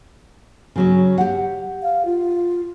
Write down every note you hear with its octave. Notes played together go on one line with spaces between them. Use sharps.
C#3 F#3 C#4
G4 F#5
F5
F4